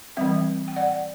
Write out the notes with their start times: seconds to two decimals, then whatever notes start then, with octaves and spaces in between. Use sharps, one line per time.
0.17 E3 G3 C4 E5 G5
0.68 G5
0.76 D5 F#5